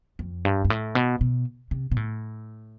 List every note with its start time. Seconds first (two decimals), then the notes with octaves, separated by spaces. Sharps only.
0.19 F2
0.45 G2
0.65 G2
0.70 A2
0.95 B2
1.21 B2
1.71 C3
1.92 B2
1.96 A2